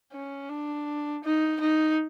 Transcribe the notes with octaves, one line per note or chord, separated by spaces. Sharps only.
C#4
D4
D#4
D#4